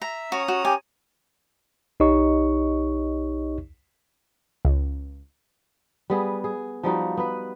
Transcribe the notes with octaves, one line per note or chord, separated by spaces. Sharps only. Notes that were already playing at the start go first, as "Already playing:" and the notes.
E5 A#5
C#4 F#4 A#5 D#6
F#4
G4 G#5
B1 D#4 G4 C#5 D#5 C#6
C#2
G3 B3 G#4
G#4
F3 G3 D#4 F#4
B3 B4